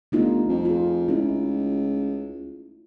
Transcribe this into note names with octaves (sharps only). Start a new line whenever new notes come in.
G1 A3 D#4 F4
F2
F4 G#4
C#2 D#4 E4